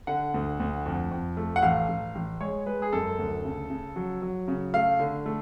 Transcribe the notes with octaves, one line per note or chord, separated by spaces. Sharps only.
D3 F#5
D2
D2
F2
F2
A3
F#5
A1 F5
A1
A1
G#3 C#5
G#3 B4
G#4
F#2 A4
D2
C#3
C#3
F#3
F#3
C#3
A3 F5
D3
A3